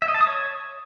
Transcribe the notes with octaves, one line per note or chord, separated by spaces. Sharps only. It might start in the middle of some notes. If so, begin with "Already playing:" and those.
E5
D#5
A5
D#6
C#5